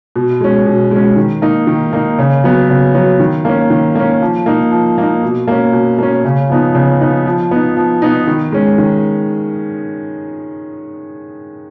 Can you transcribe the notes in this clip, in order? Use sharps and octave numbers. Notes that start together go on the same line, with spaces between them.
B2
G#3 C#4
B2
G#3 C#4
D#3
A#3 D#4
D#3
A#3 D#4
C#3
F#3 B3
C#3
F#3 B3
D#3
A#3 C#4
D#3
A#3 C#4
F3
A#3 D#4
F3
A#3 D#4
B2
A#3 C#4
B2
A#3 C#4
C#3
F3 B3 D#4
C#3
F3 B3 D#4
F3
B3 D#4
F3
B3 D#4
D#3
G#3 C#4
D#3